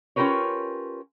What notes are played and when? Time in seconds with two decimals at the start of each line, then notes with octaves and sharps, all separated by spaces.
0.16 C#4 F4 G4 A#4 B4 C#5